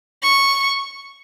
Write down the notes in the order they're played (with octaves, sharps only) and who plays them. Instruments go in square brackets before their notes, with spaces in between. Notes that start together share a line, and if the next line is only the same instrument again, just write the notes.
[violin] C#6